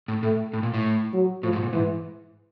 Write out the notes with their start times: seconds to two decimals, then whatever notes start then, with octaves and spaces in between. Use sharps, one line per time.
0.08 A2
0.23 A2 A3
0.53 A2
0.63 A#2
0.74 A2
1.13 F#3
1.43 A2 F3
1.53 G#2
1.63 A#2
1.73 G#2 E3